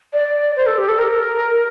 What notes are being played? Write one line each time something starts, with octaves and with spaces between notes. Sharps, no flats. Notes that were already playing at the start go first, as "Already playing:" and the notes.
D5
C5
A4
G4
A4
A#4